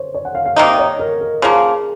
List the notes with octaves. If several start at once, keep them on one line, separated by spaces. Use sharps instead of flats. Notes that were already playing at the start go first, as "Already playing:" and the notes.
Already playing: C5 C#5
C#5
F#5
F5
F5
C3 D#3 A#3 D#4 D#5
C#5
A#4
A#4
C#3 F3 A#3 G#4